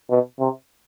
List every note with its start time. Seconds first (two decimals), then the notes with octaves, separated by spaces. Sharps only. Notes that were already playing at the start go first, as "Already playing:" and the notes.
0.10 B2
0.40 C3